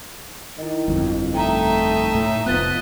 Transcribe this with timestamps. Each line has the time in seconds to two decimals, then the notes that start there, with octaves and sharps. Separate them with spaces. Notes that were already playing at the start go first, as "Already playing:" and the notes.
0.58 D#3 E4 D#5
0.88 G1 F2
1.34 A3 D#4 E5 G5 A#5
2.15 A2
2.46 F1 F3 B3 D#5 F#6 A6 B6